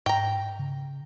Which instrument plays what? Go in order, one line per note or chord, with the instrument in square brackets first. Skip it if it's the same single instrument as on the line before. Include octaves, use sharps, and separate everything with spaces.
[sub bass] G#2 [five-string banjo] G5 A#5
[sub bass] C#3